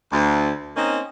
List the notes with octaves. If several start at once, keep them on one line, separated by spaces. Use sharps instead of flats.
D2
A#3 C4 C#4 D#4